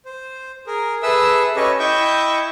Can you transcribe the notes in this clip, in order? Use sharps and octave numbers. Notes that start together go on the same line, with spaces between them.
C5
G#4 A#4
G#4 A4 B4 E5 E6
C#4 G4 A4 B4 C#5 D#5
E4 D#5 E5 G5 C#6 G6